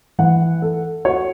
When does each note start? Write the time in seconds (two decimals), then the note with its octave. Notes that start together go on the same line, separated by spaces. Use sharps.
0.19 E3 F#5
0.62 A4
1.05 F#4 C#5